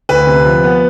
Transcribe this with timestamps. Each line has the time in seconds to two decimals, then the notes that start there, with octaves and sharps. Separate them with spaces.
0.09 D2 B4
0.27 C3
0.45 F3
0.64 B3